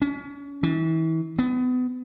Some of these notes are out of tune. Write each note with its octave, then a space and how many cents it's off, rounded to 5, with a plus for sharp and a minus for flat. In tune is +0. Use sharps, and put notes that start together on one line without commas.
C#4 +35
E3 -35
B3 +30